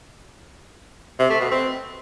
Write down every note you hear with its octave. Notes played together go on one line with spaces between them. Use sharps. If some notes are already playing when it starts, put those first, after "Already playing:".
C3
A3
B2
C4